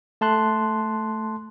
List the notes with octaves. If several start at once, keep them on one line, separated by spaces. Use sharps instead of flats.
A3 A5 C6 F#6